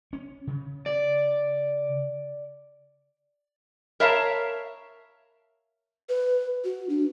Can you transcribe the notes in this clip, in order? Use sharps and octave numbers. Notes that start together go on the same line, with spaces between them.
C#4
C#3
D5
A#4 C#5 E5 F5 A5 A#5
B4
F#4
D4